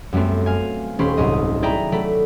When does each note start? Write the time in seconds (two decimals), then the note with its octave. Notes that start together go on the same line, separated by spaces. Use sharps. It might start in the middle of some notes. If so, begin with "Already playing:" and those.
0.13 F#2 G3 A3 B3 C4
0.46 F5 G#5
0.99 D#1 C#4 G4 C5 B5 C6
1.17 C2 G#2 F#3 G#4 D#5 D#6
1.62 E4 G#4 D5 G5 A#5 B5
1.92 F#3 A3 D5 B5